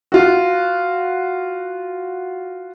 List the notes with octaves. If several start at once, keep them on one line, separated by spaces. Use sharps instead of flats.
F4 F#4